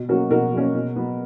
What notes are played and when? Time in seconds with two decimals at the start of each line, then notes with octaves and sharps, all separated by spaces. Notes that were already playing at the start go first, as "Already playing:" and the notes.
Already playing: B2
0.09 F#3 A#3 C#4 F#4 A#4
0.30 B2 F#4 A#4
0.53 F#3 A#3 C#4
0.74 B2
0.96 F#3 B3